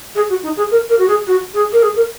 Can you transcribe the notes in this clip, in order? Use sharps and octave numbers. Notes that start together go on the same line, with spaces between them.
G#4
F#4
D#4
G#4
A#4
A#4
F#4
G#4
F#4
G#4
A#4
G#4
A#4